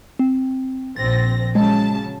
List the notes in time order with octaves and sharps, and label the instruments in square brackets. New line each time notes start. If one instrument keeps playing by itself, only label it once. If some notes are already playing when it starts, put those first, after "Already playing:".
[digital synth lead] C4
[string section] A#1 C4 A#6 [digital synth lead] A6
[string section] C#3 F#3 A5 [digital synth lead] G#3